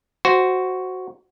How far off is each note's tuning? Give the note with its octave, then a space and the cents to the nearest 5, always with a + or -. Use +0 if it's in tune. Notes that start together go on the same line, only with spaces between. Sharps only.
F#4 +0 C5 +0